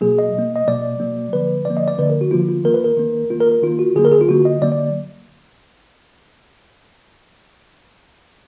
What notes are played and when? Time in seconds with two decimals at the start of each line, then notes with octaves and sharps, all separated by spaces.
0.01 B2 F#3 A#3 G#4
0.19 D#5
0.34 B2 F#3 A#3
0.56 D#5
0.68 B2 F#3 A#3 D5
1.00 B2 F#3 A#3
1.33 D3 F3 A#3 B4
1.65 D3 F3 A#3 D5
1.77 D#5
1.88 D5
1.98 D3 F3 A#3 B4
2.10 A#4
2.21 F#4
2.31 D3 F3 A#3 F4
2.48 F4
2.64 D#3 A#3 A#4
2.74 B4
2.84 A#4
2.97 D#3 A#3
3.30 D#3 A#3 F4
3.40 A#4
3.52 A#4
3.62 D#3 A#3 F4
3.79 F#4
3.96 D3 F#3 A#3 G#4
4.05 A#4
4.12 G#4
4.21 F4
4.29 D3 F#3 A#3 F#4
4.45 D#5
4.62 D3 F#3 A#3 D5
4.72 D5